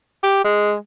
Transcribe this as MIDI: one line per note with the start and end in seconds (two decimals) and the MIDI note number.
0.23 0.40 67
0.44 0.74 56